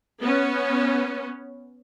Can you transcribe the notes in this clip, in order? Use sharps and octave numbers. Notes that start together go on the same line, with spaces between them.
B3 C#4